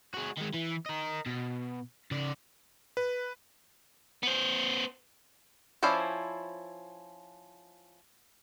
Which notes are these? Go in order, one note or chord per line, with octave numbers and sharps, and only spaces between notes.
G#3 F#4
D#3 G#3
E3
A#4 D#5
B2
C#3 D5
B4
B3 C5
F3 C#4 E4 C5 D5